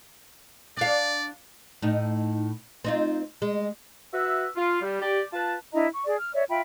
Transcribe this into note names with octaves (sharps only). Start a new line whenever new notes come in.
D4 D5 F5
A2 D#4
C4 D#4 F4
G#3
F#4 B4 E5
F4
G3
G4 D5
F4 B4 A5
D4 E4 D#5 A#5
C#6
G#4 D5
F6
C#5 D5 E5
F4 E5 G5 B5